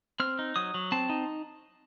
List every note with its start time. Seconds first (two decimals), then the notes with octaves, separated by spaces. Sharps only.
0.20 C4 F6
0.39 D#4
0.56 F#3 D#6
0.74 F#3
0.92 C4 A5
1.10 D#4